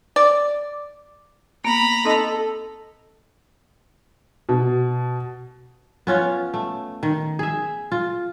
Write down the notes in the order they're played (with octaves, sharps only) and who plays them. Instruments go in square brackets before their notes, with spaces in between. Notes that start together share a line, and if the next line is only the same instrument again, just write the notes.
[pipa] D5
[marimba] A#3 B3 [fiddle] A#5 B5
[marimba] C4 D#4 D#5 [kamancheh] A4
[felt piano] B2
[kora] B3 C#4 F4 C#5
A3
D#3
G#4 E5
F4